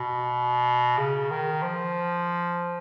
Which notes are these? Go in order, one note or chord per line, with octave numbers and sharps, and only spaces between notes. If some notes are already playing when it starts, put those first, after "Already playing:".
Already playing: B2
C#3
D#3
F3